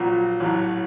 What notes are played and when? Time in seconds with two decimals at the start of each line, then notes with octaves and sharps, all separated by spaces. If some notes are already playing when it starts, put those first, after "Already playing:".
Already playing: A#1 A#2 F#3 F#4
0.40 A1 A2 F#3